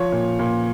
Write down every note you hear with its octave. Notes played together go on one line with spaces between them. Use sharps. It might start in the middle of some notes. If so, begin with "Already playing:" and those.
Already playing: F3 C#5
A#2
A#2